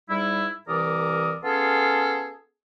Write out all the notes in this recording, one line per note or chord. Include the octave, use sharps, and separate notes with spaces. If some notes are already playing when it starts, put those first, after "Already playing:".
G#2 G3 E4
C2 E3 A#4 D5 D#6
B3 C#4 F4 G#4 A4